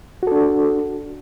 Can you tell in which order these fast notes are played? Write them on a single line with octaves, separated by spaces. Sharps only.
F#4 A4 D4